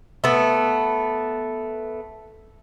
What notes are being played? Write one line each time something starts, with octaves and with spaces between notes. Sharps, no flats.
A3 B3